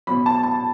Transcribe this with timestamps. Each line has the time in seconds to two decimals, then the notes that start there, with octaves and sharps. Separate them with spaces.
0.07 F#3 B5
0.10 B2
0.26 A5
0.43 A5